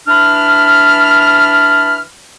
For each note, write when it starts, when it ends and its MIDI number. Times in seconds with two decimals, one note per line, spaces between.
0.08 2.02 52
0.08 2.02 62
0.08 2.02 83
0.08 2.02 89